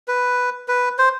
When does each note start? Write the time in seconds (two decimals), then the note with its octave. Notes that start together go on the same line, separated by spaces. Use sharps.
0.08 B4
0.68 B4
0.98 C5